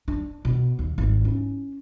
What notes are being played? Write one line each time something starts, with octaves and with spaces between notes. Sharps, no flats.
D4
B2
D#2
G#1
C#4 E4